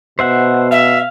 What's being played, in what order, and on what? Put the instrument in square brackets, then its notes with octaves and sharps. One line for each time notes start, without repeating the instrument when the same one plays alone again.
[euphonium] B2 [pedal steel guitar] C5 E5 F#5
[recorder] E5 [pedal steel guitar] F5